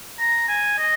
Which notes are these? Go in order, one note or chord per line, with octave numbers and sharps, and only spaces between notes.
A#5
G#5
D#5